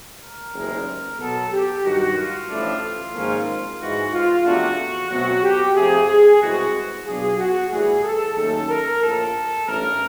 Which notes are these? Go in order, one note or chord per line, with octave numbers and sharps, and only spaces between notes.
A#4
F#1 E2 C3 D#3 G#3
B2 F#3 B3 A4
G4
G2 D#3 F#3 F#4
F4
A1 A2 F3 A3 D4
G#1 G#2 F3 A#3 C#4
G#2 E3 G#3 F#4
F4
E2 C3 F3 A3 D4 F#4
B2 F#3 A3 C4 F#4
G4
F2 C3 F3 A3 G#4
G#4
C2 B2 G#3 C4 E4 F#4
B2 F#3 B3 D4 F4 G#4
F#4
A2 E3 G3 G#4
A4
D#2 D#3 F#3 A3 C#4 A4
A#4
A#1 A2 F3 A4
A1 G2 E3 A#4